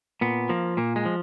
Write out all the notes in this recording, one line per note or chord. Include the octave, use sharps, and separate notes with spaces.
A#2 B3
F3 A#3
A#2 A#3
G#3
F3